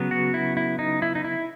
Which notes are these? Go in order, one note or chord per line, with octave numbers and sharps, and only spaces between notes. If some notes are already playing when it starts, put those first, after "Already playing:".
Already playing: C#3 F#3 B3
F#4
E4
E4
D#4
E4
D#4
E4